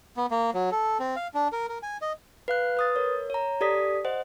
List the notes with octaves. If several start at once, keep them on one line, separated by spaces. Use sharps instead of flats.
B3
A#3
F#3
A4
C4
F5
D4
A#4
A#4
G#5
D#5
B4 F5 F#6
B4 D#6 A6
A#4 C#5
C#5 A#5
G4 A4 D5 D#6 B6
C5 D#5 F#5